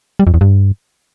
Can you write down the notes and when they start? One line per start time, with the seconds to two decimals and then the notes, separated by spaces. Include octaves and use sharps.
0.19 G3
0.27 F2
0.34 E2
0.41 G2